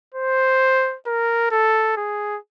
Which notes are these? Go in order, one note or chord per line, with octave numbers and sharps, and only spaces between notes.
C5
A#4
A4
G#4